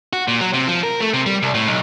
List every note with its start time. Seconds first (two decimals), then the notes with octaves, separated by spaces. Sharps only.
0.13 F#4
0.28 A#2
0.41 F#3
0.54 C3
0.67 F3
0.83 A#4
1.00 A3
1.14 C3
1.26 G3
1.43 C2
1.54 A2
1.68 B1